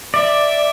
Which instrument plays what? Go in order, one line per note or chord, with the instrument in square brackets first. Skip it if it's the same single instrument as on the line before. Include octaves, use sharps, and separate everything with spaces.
[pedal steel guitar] D5 [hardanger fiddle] E5